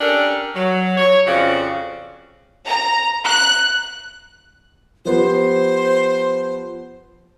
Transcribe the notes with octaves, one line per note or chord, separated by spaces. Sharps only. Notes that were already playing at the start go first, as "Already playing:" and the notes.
C#4 D4 G4 A4 A#4
F#3
C#5
F2 C#3 C4 F#4 D5 F5
A#5
F#6
F3 B3 G4 C5